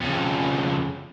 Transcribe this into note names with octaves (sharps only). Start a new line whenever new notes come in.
F2 C#3